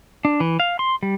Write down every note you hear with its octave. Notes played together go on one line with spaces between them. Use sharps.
D4
E3
F5
C6
G3